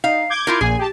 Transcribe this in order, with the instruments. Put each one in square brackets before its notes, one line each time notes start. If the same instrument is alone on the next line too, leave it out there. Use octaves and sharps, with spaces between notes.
[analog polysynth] D#4 [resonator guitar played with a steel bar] F5
[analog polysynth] D6 G6 G#6
[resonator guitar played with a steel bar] E4 F4 A#4
[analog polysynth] A#1 A#2 G#5 [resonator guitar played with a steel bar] G#4
[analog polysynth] G4 A5